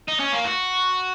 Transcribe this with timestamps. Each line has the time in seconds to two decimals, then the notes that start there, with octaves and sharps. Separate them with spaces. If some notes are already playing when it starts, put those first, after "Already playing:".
0.08 D#4
0.20 C#4
0.32 A#3
0.44 F#4